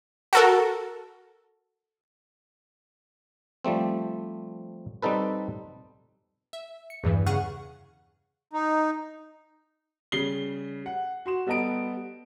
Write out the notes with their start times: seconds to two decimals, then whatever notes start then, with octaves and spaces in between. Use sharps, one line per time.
0.33 F#4 A4 A#4
3.65 F3 G3 A3 C4
5.02 G3 C4 D#4 A4 B4
6.53 E5
6.90 C#7
7.04 E2 G2 E3
7.26 C#3 G#4 F#5 C#6 F6 F#6
8.53 D#4
10.12 C#3 G3 C7 G7
10.86 F#5
11.26 F#4 C6 E7
11.46 G3 B3 A4 D#5 A#5 D7